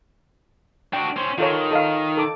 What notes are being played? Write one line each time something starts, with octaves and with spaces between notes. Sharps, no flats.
D4 F#4 G5
C#4 C5
D#3 F4 A4 C#5
A4 D#5 F5
A4 D6